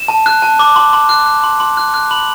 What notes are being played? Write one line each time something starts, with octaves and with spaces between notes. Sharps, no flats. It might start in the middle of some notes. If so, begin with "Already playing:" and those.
Already playing: E7
A5
F#6
A5
D6
C6
C6
F#6
F#6
C6
C6
F#6
F#6
B5 F#7